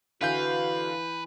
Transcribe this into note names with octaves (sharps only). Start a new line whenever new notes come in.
D3 E3 F#4 B4 F5 G6